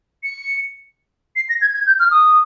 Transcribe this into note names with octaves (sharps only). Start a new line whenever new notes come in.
C#7
C7
A#6
G#6
G#6
G6
F6
D#6